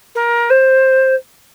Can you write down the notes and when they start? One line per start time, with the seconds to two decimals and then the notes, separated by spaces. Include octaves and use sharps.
0.15 A#4
0.50 C5